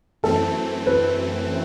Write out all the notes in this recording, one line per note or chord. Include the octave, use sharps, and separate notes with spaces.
F#2 E3 A3 C4 A4
B4